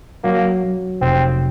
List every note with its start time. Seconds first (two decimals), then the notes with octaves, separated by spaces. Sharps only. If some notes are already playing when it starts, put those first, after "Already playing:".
0.24 F#3 A#3
0.63 F#3
1.01 F1 C4